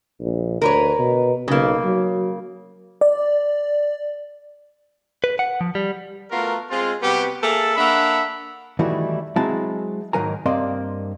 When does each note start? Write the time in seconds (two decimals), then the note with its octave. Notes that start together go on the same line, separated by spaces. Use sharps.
0.21 A#1
0.62 D2 A#4 B4 C#5
0.99 B2
1.48 B1 C#3 A#3
1.85 F#3
3.01 D5
5.24 B4
5.39 F#5
5.61 F3
5.75 G3
6.31 A3 B3 F4 F#4 A#4
6.69 G#3 C4 F4
7.02 C3 G3 B3 F#4 G4
7.42 A#3 G#4 A4 E5 A5
7.76 A#3 D4 E5 F#5 B5
8.79 D#3 E3 G3 A3 E4 F#4
9.36 F#3 G#3 C4 E4 F#4 A5
10.13 G#2 D#3 F#3 A#4 G#5 A#5
10.46 G2 A#3 C4 D5 D#5 C6